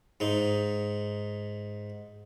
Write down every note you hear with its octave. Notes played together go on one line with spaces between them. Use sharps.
G#2 D#4